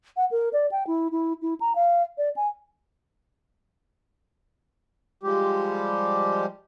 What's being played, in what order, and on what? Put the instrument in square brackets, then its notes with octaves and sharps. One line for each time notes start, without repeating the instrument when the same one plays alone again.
[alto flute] F#5
A#4
D5
G5
E4
E4
E4
A#5
F5
D5
G#5
[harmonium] F3 G3 G#3 G4